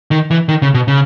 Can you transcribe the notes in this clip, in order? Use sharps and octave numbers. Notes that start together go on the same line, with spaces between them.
D#3
E3
D#3
C#3
B2
C#3